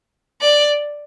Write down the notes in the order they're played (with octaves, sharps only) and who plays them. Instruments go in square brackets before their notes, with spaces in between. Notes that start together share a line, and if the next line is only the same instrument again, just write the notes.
[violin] D5